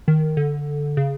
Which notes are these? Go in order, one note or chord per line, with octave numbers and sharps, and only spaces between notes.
D#3
D3
C#3